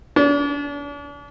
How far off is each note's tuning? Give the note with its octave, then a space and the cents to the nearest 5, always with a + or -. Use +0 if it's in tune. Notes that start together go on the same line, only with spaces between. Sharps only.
D4 -40